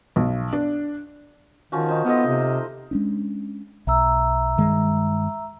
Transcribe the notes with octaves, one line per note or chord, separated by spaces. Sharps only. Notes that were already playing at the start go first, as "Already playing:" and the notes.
B1
D4
D#3 F3 C#4 F#4
D#4 C5
B3 F4 A4 D#5
C3
G#3 C#4 D4
B1 E5 A#5 E6
G2 D#3 G#3